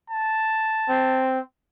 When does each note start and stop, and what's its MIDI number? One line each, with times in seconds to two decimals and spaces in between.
0.10 1.27 81
0.89 1.39 60